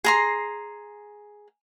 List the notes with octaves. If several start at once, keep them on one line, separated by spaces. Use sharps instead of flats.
G#4 A#5 C6